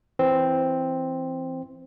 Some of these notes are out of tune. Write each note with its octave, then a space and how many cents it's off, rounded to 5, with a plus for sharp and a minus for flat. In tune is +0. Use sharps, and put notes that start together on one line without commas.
E3 +10 C4 +0